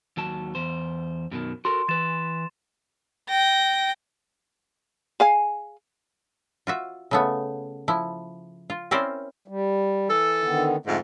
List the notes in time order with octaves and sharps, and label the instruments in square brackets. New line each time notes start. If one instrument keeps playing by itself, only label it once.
[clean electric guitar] D#2 F#3 A5
E2 C5
F#2 B2 D#3
[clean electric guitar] F#4 A4 A#4 [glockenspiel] C6
[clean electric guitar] E3 B4 [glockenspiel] A6 E7
[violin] G5 A#6
[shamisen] G#4 F5 G#5
[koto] F4 F#4 E5
C#3 A3 B3
F3 E4
F4
C4 C#4 E4 A#4 C5 D5
[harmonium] G3
[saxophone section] E3 A4
[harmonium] D3 D#3 B3
[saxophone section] F2 G#2 [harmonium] D3 A3